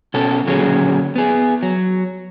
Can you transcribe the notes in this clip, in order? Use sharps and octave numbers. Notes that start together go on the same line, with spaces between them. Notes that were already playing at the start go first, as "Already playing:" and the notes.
B2 C#4 A4
A#2 D3 F#3 C#4 G#4
B3 G#4
F#3